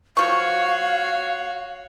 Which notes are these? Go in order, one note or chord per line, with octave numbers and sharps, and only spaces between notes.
F3 F#4 C#5 F5 C#6